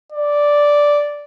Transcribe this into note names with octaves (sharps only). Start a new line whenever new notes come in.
D5